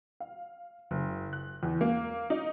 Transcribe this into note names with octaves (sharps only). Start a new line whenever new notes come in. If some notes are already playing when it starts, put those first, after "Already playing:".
F5
F#1
F#6
E2
A#3
D#4